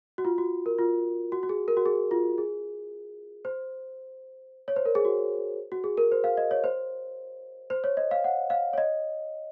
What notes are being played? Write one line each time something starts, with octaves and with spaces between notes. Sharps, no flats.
F#4
F4
F#4
A#4
F4
F#4
F#4
G#4
A#4
F#4
G#4
F4
G#4
C5
C#5
C5
A#4
G#4
F#4
F#4
G#4
A#4
C5
F5
D#5
C#5
C5
C5
C#5
D#5
F5
F#5
F5
C#5
D#5